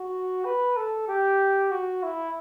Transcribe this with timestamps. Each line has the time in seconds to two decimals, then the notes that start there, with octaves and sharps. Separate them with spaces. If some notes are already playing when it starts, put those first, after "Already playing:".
Already playing: F#4
0.45 B4
0.77 A4
1.08 G4
1.71 F#4
2.03 E4